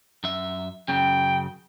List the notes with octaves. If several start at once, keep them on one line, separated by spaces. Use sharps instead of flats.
F#2 E5
F#2 C#3 G5